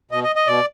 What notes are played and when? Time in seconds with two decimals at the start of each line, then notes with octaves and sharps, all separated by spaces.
0.11 B2 D#5
0.24 D#5
0.36 D#5
0.47 B2 D5